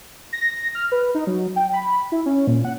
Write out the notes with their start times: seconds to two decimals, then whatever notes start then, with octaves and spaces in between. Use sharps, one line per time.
0.33 A#6
0.75 F6
0.92 B4
1.15 D#4
1.27 F#3
1.56 G5
1.73 B5
2.12 E4
2.26 C#4
2.47 A#2
2.65 F#5